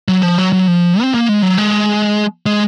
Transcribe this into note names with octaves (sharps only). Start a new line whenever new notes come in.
F#3
F3
F#3
F#3
F3
C4
A#3
G#3
F#3
G#3
G#3